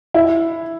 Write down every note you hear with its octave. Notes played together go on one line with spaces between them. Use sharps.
E4